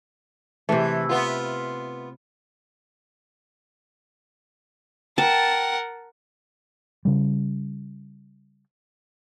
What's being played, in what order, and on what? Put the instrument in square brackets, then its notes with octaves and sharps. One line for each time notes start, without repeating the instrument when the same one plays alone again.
[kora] C3 A3 [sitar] E3
[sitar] B3 F4
[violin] A#4 F#5 [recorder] G5 [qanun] A5
[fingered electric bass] C#3 G3